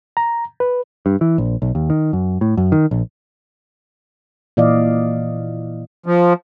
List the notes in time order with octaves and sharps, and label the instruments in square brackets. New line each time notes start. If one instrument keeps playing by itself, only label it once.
[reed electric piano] A#5
B4
[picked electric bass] G2
E3
A#1
B1
D#2
D#3
F#2
A2
F#2
D#3
A#1
[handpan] A#2 E3 D5 D#5 F5
[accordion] F3